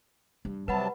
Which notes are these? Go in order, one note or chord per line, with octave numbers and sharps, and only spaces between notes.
G2
C3 F#3 G3 B4 F#5 A5 B5